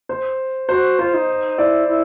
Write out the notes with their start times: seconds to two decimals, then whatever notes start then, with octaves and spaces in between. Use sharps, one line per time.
0.09 C5
0.69 F#4 C5
0.99 F4 C5
1.14 D#4
1.58 E4 D5
1.88 E4